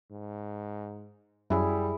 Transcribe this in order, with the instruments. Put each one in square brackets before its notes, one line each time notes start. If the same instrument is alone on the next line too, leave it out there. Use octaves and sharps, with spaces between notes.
[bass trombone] G#2
[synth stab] F#2 [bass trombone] G3 [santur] E4 G#4